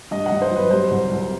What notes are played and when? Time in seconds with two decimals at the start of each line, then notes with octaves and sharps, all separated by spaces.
0.11 G2 D#5
0.26 F#5
0.31 G2
0.42 C5
0.51 F#3
0.56 B4
0.71 G3 C5
0.91 C2
1.11 C2